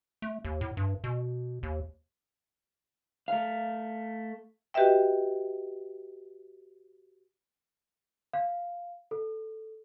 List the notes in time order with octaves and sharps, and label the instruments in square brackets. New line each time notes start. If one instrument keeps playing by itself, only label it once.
[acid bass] A3
D#2
A2
G2
B2
D#2
[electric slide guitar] A3 F5
[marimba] F#4 G4 B4 D#5 E5 G5
[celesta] F5
A4